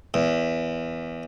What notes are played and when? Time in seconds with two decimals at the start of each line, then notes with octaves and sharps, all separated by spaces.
0.14 E2